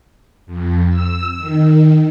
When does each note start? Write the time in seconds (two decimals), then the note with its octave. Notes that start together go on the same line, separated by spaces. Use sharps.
0.46 F2
0.89 E6
1.37 D#3